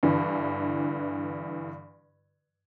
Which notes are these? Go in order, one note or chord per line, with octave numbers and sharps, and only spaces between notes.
G2 D3 E3